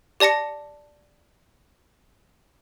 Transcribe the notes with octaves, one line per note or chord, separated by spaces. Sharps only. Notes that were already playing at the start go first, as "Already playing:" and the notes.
G4 D5 A5 A#6 C#7